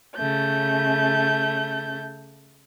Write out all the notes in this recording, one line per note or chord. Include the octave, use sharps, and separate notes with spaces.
C#3 A3 G6